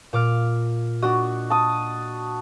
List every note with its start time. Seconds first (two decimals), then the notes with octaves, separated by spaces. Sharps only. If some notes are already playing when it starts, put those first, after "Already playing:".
0.13 A#2 D6 F6
1.02 D4 F#4 D#5
1.50 A5 D#6